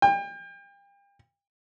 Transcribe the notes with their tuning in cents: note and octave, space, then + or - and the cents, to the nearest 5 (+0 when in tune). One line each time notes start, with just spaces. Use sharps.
G5 +35